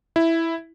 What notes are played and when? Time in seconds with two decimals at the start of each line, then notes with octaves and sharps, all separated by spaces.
0.16 E4